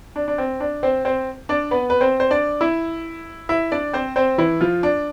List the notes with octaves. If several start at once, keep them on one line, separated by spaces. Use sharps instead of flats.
D4
D4
C4
D4
C4 C5
C4 C5
D4 D5
B3 B4
B4
C4 C5
C5
D4 D5
E4 E5
E4 E5
D4 D5
C4 C5
C4 C5
E3 E4
F3 F4
D4